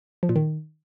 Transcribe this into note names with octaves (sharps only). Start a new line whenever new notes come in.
F3
A#2
D#3